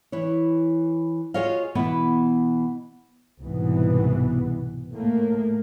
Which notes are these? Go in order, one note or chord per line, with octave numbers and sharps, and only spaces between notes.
E3 B4 C#5
F4 F#4 G#4 C#5 D#5 F5
B2 E3 B3 B4
C2 G#2 B2 E3 B3
A2 A3 A#3